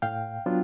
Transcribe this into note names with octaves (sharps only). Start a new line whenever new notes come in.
A2 F5 G5
F#3 B3 D4 F4